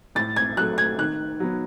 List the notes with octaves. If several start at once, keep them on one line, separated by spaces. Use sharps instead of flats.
A2 A6
G#6
F#3 A3 F#6
G#6
D#3 F#6
F#3 B3